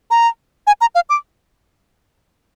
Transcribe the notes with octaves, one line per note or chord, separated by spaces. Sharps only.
A#5
G#5
A#5
F5
D6